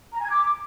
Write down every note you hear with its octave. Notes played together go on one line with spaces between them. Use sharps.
A#5
G#5
G#6
D6